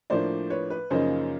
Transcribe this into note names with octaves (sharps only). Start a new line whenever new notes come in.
A2 F3 A#3 D4 C5 D5
B4 C#5
B4
F#2 C#3 F3 A#3 D#4 C5